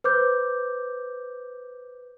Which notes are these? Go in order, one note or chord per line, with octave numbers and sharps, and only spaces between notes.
B4 C5 D6 G6